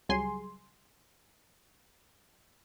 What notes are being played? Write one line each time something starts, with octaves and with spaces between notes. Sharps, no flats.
C#2 F#3 G3 G#4 G#5 C6